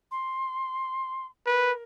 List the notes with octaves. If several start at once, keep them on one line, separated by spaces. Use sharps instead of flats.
C6
A#4 B4